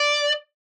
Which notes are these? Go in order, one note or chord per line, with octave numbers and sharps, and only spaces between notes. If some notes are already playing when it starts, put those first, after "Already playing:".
Already playing: D5